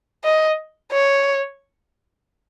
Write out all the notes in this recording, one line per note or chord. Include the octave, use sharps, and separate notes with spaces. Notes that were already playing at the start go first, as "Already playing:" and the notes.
D#5
C#5